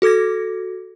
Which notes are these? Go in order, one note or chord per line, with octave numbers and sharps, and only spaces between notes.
F#4 A4 D6 G#6 A#6